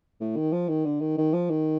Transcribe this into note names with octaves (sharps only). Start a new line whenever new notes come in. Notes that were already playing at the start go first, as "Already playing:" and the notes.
A2
D#3
F3
D#3
D3
D#3
D#3
F3
D#3